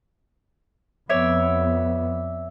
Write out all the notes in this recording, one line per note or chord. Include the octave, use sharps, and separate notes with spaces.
F2 B3 C#5 D5 E5